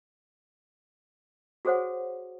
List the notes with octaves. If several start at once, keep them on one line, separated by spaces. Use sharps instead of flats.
F#4 G#4 A4 C5 C#5 F#5